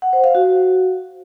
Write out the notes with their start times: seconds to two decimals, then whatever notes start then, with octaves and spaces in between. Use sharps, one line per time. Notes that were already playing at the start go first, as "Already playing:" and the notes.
0.02 F#5
0.13 C5
0.24 F5
0.35 F#4